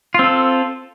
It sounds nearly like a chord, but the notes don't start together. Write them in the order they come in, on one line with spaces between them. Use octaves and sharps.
F4 C4 A4